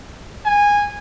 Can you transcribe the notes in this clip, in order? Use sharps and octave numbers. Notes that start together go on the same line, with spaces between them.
G#5